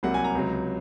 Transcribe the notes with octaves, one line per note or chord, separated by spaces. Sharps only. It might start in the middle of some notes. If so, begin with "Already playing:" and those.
C2 C3 F#3 A#3 F#5
G#5
A#5
C#2 C3 F#3